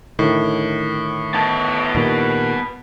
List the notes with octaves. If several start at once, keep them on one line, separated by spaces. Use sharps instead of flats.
A2 D3 D#3
B3 A5
A#2 D#3 G3